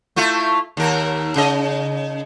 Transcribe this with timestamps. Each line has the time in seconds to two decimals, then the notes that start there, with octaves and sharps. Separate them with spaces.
0.16 A3 E4 F4
0.77 D#2 A#4
1.36 C#3 D#5